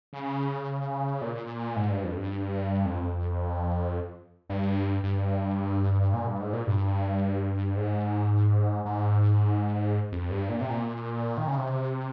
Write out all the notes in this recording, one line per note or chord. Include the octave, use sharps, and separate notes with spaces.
C#3
A#2
G#2
G2
F2
G2
F2
G2
G2
A#2
G2
G#2
A#2
G2
G#2
G#2
F2
G2
A#2
C3
A#2
D#3
C#3
C3